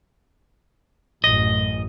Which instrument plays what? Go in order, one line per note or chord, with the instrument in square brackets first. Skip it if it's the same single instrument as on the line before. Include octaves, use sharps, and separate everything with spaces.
[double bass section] A1 F#2 [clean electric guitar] D#5